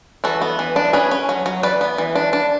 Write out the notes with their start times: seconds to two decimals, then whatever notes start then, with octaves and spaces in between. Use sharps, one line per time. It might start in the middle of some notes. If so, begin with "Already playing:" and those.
0.24 E3 F#4 A4
0.42 B3
0.59 E3
0.76 D4
0.93 C#4 G#4 B4
1.11 C#4
1.29 F#3
1.46 F#3
1.63 E3 B4 D5
1.81 B3
1.98 E3
2.15 D4
2.33 D4